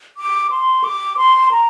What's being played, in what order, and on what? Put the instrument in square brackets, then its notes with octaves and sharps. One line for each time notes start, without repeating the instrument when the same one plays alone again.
[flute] D6
C6
D6
C6
A#5